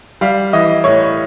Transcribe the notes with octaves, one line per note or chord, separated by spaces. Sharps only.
G3 F5
E3 D#5
A2 C#5